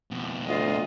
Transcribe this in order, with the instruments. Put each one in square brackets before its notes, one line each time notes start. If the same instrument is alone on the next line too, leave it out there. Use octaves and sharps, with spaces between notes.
[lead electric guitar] F2 B2
[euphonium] D2 [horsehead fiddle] F4 D#5